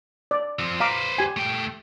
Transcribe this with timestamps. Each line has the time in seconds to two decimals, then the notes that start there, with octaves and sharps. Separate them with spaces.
0.31 D5
0.59 F3 C4
0.80 B4 C5 F5 A#5 D6
1.18 G4 G#5
1.37 A3 G5